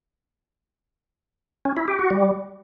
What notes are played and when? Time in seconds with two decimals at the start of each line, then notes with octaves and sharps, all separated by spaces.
1.65 C#4
1.77 E4
1.88 G4
1.99 F#4
2.10 G3